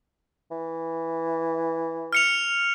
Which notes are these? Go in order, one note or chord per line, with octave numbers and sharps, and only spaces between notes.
E3
F6 C#7 F7